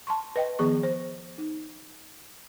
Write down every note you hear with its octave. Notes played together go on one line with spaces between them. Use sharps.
A5 C6 C#6
B4 D#5 G5
D#3 F3 B3 G#4 C#6
C5
D#4